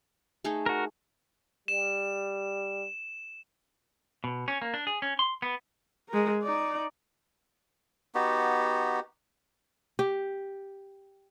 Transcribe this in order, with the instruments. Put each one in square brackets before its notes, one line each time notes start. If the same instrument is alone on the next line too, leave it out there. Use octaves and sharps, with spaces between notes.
[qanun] A3 D#4 G#4
[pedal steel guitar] F#4 A#4
[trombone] G3 [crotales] E7
[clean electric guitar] B2
C#4
A#3
D4
G#4
C#4
C6
B3
[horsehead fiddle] G#3 A#4
D#4 D5
[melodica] B3 D#4 F#4 G4
[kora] G4